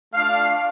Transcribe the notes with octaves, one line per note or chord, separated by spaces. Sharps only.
A3 D4 F4 F5